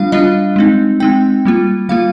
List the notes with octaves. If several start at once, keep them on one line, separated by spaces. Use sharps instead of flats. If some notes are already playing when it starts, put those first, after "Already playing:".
Already playing: G3 D4 F4 F5
G3 D4 F4 D#5
G#3 C4 D#4
G#3 C4 D#4 G5
G3 A#3 F4
G3 A#3 F4 F5